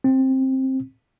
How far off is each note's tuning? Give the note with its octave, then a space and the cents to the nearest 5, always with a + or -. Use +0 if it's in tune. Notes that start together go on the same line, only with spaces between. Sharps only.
C4 +15